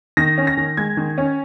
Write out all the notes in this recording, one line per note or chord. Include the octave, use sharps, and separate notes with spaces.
D#3 A#6
C#4
A#6
D#3
G#3 G#6
D#3
C#4